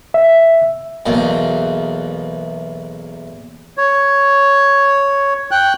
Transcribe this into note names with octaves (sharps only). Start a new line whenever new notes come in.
E5
B1 E2 A#3
C#5
G5 F#6